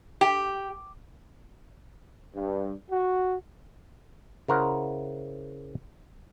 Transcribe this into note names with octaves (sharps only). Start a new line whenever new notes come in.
G4
G2
F#4
C#3 E4 A#4 C5 F#5